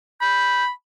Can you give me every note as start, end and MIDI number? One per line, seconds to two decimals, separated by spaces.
0.21 0.70 83
0.21 0.64 91